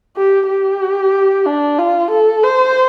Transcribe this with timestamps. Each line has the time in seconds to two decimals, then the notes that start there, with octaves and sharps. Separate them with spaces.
0.17 G4
0.49 G4
1.46 D4
1.78 F4
2.11 A4
2.44 C5